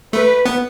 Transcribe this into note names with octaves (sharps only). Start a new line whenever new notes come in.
A3 B4
B3